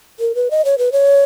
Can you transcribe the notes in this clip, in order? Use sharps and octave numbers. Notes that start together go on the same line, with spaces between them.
A#4
B4
D#5
C#5
B4
C#5